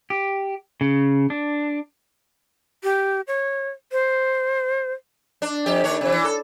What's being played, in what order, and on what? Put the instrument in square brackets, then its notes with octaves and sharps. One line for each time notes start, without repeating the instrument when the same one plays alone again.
[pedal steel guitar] G4
C#3
D4
[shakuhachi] G4
C#5
C5
[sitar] D4
F2 G4
D#2 D4 C#5
C3 E3
E3
A4